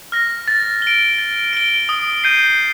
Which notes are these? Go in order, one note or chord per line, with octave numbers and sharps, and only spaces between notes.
F6 A#6
A6
D7 G7
A6
D7 G7
D#6
G6 C7 D#7